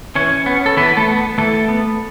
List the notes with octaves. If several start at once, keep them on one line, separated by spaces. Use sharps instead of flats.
E3 C#4 C#5
B3
A4
E3 B3 B4
A3 A4
B3
E3 A3 A4
B3